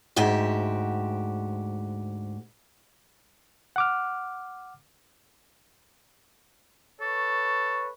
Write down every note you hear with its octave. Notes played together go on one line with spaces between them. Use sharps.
D2 G#2 F#4 G4 E5
F#5 D6 F6
A4 B4 C#5 C#6